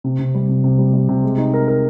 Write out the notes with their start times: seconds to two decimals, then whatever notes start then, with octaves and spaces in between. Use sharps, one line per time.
0.04 C3
0.19 C3
0.35 G3
0.49 C3
0.64 C3
0.78 G3
0.94 G3
1.09 C3
1.23 G#3
1.38 D#4
1.54 A#4
1.68 A#4